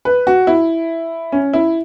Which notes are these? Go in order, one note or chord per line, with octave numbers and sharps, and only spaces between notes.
B4
F#4
E4
C#4
E4